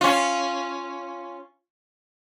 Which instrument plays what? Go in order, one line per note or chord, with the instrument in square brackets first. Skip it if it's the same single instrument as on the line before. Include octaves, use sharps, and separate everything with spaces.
[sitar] C#4 F4